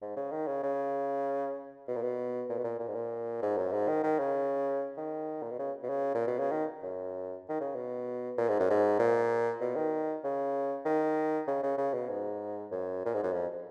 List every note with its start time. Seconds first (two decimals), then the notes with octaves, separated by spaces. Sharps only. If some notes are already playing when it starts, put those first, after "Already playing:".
0.02 G#2
0.16 C#3
0.32 D#3
0.47 C#3
0.63 C#3
1.87 B2
1.96 A#2
2.02 B2
2.49 A#2
2.58 B2
2.64 A#2
2.79 A#2
2.88 G#2
2.95 A#2
3.42 G#2
3.58 F#2
3.73 G#2
3.88 D#3
4.03 D#3
4.19 C#3
4.97 D#3
5.42 A#2
5.50 B2
5.59 C#3
5.83 B2
5.89 C#3
6.14 A#2
6.27 B2
6.39 C#3
6.51 D#3
6.83 F#2
7.49 D#3
7.60 C#3
7.75 B2
8.38 A#2
8.48 G#2
8.59 F#2
8.70 G#2
8.99 A#2
9.61 B2
9.76 D#3
10.24 C#3
10.85 D#3
11.47 C#3
11.63 C#3
11.78 C#3
11.94 B2
12.09 G#2
12.71 F#2
13.06 A#2
13.14 G#2
13.23 F#2
13.33 F2